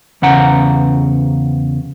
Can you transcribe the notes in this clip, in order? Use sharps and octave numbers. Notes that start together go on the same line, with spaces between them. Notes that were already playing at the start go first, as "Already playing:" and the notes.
E2 C#3 F#5 A#5